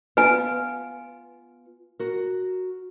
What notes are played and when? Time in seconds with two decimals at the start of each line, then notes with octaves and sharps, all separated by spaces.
0.17 B3 F4 B4 F#5 G#5
1.99 F#4 A#4